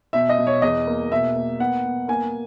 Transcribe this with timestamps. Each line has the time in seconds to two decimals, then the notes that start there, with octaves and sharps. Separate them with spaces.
0.13 B2 E5
0.29 D#5
0.38 B2
0.47 C#5
0.62 E2 D#5
0.87 A#3
1.11 B2 E5
1.35 A#3
1.60 B3 F#5
1.85 B3
2.08 A#3 G#5